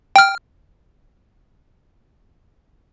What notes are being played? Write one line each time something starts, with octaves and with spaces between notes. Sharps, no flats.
G5 F6